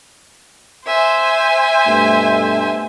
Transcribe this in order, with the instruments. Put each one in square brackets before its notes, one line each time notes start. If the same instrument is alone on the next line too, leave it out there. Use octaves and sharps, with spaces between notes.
[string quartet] C5 E5 G#5
[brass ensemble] G2 B2 A3